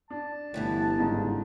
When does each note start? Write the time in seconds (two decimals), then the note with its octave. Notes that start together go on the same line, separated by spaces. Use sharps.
0.10 D4 A5
0.54 G1 A2 D3 E3
0.99 G#2 C#3 D#4